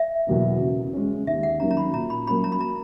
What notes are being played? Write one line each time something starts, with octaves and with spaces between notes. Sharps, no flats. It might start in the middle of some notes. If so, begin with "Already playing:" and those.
Already playing: E5
E2 B2 F#3 A#3
C#3
G#3 C#4
D#2 E5
F#5
D#3 F#3 A#3 C#4 A#5
A#5
B5
A#2 A#5
B5
F#3 A#3 C#4 B5
A#5
B5
A#5